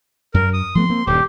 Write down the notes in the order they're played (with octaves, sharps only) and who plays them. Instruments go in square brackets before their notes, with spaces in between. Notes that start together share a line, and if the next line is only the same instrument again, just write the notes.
[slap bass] F#2 [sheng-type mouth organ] A#4
[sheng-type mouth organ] D#6
[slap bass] F3 A3 B3 [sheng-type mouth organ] C6
[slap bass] A#3 C4
[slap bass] D#1 G2 [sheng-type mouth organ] G4